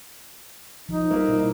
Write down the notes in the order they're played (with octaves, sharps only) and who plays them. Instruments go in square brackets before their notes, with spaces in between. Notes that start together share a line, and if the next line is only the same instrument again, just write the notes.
[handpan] F3 [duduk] D#4
[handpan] G3 A#4 E5 [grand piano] A#3
[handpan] B2 E4